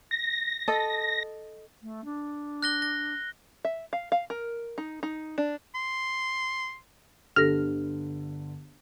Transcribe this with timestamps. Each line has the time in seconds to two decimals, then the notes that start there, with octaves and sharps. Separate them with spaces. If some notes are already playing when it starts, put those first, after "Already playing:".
0.11 A#6
0.68 A4 D#5
1.82 A3
2.04 D4
2.63 F#6 A#6 G7
2.82 A#6
3.65 E5
3.93 F5
4.12 F5
4.30 A#4
4.78 D#4
5.03 D#4
5.38 D4
5.75 C6
7.36 G1 D3 G4 A4 F6 A#6